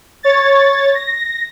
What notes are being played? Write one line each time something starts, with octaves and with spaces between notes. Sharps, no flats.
C#5 A6
A#6